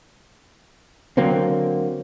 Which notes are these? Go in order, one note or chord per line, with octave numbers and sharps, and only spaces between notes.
D3 F#3 A#3 C4